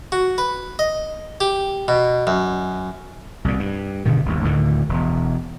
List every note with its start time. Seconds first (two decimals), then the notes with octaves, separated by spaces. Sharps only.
0.12 F#4
0.38 B4
0.79 D#5
1.41 G4
1.88 B2
2.27 F#2
3.44 C2 A#2
3.59 G2
4.06 G2 B2 D3 D#3
4.25 G1 D#2
4.44 D2 A2 D3 D#3
4.89 E1